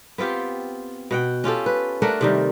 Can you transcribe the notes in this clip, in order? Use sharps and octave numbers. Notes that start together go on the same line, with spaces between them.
B3 C4 F4 G4
B2 F#5 G5
C#4 F4 G4 A4
B4
A3 D4 A#4 F#5
C3 D#3 G3